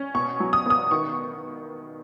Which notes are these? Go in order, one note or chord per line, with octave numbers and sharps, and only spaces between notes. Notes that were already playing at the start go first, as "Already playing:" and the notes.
Already playing: C#4
B2 C#6
F#3
D#6
B3 D#6
D#3 C#6